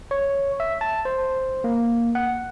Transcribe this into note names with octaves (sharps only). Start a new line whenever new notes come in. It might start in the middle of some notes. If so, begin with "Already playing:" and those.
C#5
E5
A5
C5
A#3
F#5